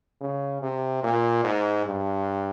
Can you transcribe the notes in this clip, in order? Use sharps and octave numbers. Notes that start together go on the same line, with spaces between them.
C#3
C3
A#2
G#2
G2